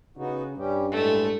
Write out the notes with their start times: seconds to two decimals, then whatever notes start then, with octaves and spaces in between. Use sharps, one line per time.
0.17 C#3 B3 D#4 F#4
0.57 G2 G3 C#4 G4
0.92 A2 G#3 A3